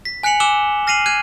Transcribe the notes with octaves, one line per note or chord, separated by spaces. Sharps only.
B6
G#5 F#6 B6 C#7 F7 F#7
G#5 D6 E6 F#6 E7 G7
F6 A#6 C7 D#7 F7 F#7
F#6 G#6 D#7